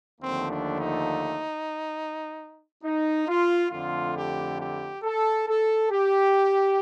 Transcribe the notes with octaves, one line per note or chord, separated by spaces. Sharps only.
D#2 D3 F3 A3 C4
D4
D#4
D#4
F4
F2 D3 A3 F4
G4
G4
A4
A4
G4